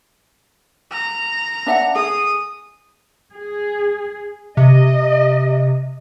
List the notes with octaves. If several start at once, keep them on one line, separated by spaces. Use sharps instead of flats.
A#5
D4 E5 F#5
G#4 D#6
G#4
C3 D#5